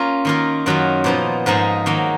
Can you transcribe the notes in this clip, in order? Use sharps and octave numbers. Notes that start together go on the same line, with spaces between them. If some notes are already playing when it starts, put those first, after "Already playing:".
Already playing: A#3 C#4 F4
D#3 A#3 F4 A#4
F#2 D#3 F#3 C#4 F4
A#2 F3 B3 D#4
G#2 F3 A#3 D#4 G#4
D#3 F#3 A#3 D#4